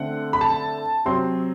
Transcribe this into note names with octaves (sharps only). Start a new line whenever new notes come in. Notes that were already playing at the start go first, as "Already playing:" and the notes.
Already playing: D3 A3 C4 F#5
B5
A5
C3 F#3 C4 C6